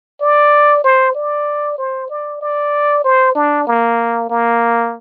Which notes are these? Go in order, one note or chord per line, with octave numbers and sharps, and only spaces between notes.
D5
C5
D5
C5
D5
D5
C5
D4
A#3
A#3